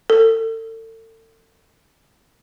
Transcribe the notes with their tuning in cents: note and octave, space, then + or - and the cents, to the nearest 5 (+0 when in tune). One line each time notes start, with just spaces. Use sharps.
A4 +35